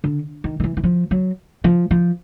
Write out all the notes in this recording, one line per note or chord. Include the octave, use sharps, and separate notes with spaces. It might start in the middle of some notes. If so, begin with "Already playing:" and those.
D3
D#3
D#3
E3
E3
F3
F#3
F3
F3